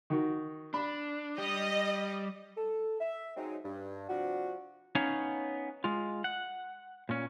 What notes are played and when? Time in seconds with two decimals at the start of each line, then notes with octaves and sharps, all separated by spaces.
0.10 D#3 D#4 F#4
0.74 D4 B5
1.38 G3 G4 D#5
2.57 A4
2.99 E5
3.36 F#3 G#3 C4 D#4
3.64 G2
4.09 C3 F3 G3 D4 F#4
4.95 B3 C#4 D#4 C#5 F5
5.84 G#3 F4
6.24 F#5
7.09 A#2 C#4